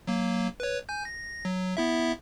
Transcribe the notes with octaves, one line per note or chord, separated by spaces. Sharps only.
F#3 A#3
B4 C#5
G#5 G6
A#6
F#3
B3 E4 E5